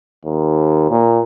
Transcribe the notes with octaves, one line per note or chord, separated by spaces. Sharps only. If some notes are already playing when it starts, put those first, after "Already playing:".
D#2
A#2